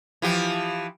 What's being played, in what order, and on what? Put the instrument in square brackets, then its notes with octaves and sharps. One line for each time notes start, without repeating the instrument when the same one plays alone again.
[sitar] E3 F3 G4